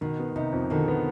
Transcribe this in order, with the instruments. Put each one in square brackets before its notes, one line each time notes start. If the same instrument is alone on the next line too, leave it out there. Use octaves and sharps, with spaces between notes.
[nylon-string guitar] B2 [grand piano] D#3
[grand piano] B3
[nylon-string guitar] C3 [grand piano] D#4
[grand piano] F2
[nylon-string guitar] B2 D3 [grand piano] D#3
[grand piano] B3